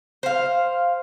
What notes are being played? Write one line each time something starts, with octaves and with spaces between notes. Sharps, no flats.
C5 F5